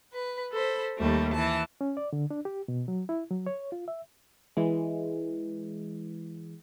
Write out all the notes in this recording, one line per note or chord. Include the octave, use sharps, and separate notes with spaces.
B4
A4 C5 B5
D#2 G3 A3
E3 A5
C#4
D5
D3
D4
G4
B2
F#3
E4
F#3
C#5
F4
E5
E3 G#3